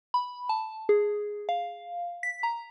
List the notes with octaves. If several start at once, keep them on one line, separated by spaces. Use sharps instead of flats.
B5
A5
G#4
F5
B6
A#5